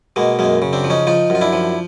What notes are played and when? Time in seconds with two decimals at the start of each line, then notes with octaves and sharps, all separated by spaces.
0.16 B2 G#3 A#3
0.39 F#2 G#3 A#3
0.62 C#3
0.73 C4 D4
0.84 F3
0.90 C#4 D#4
1.07 F3 D#4 F4
1.30 F#2 F4
1.41 D4 E4
1.53 F3